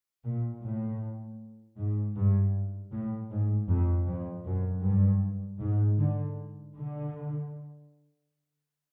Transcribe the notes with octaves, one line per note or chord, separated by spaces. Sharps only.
A#2
A2
G#2
G2
A2
G#2
F2
F2
F#2
G2
G#2
D3
D3